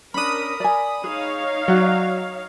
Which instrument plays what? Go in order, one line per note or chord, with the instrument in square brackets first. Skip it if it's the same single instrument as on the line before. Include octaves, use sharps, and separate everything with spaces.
[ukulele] C#4 D4 [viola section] A#4 [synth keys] B5 D#6
[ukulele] D5 G#5
[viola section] D#4 C#5 F5 [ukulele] G#4
[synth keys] F#3 [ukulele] F#4 D5 F#5